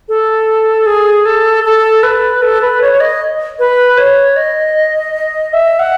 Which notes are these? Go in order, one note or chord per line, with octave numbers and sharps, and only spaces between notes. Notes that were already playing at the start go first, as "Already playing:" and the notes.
A4
G#4
A4
A4
B4
A4
B4
C#5
C#5
D#5
B4
C#5
D#5
E5
F#5